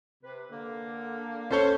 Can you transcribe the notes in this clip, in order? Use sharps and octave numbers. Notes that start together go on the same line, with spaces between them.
C3 B4
D3 A#3
C#4 A4 C5 C#5